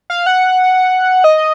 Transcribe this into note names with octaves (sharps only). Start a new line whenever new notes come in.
F5
F#5
D#5